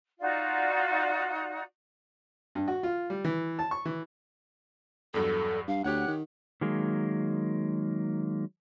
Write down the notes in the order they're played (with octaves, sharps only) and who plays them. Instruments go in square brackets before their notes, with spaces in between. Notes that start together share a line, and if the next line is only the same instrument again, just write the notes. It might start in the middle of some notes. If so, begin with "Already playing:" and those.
[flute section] D#4 F4 F#4 D5
[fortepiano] G2
F#4
F4
G3
E3
A5
C#6
E3
[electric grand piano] E2 G2 F#3 [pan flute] A4
[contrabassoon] G2 [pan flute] F5
[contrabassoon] D2 [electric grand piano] G4 C#5 F#5 [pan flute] F#6
[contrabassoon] D#3
[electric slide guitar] D#3 F#3 G#3 A#3